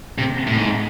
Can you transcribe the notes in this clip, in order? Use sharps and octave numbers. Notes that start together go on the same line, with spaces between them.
C3
A2
G#2